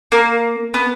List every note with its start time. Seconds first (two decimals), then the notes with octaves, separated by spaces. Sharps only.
0.12 A#3
0.74 B3